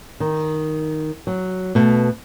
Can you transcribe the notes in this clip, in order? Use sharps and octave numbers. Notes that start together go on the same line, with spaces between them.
D#3
F#3
B2 A3